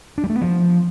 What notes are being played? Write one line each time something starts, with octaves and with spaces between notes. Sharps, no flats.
D4
G3
A3
B3
F3